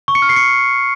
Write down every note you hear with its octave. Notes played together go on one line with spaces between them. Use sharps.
C#6
C#7
F6
C7
C#7